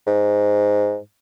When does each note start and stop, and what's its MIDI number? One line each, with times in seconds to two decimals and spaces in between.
0.07 0.98 44